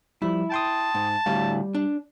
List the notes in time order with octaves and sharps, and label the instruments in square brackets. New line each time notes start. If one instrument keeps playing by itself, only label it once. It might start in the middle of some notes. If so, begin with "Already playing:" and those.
[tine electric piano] F3 G3 [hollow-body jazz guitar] E4
[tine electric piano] G5 C6 D#6 [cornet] A5
[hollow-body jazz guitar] G#2
[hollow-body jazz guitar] D2 A2 F5 [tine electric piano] G3
[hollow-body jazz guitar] D4